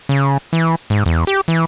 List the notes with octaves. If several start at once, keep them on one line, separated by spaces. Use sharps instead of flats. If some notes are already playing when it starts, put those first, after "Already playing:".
C#3
E3
G#2
E2
G4
E3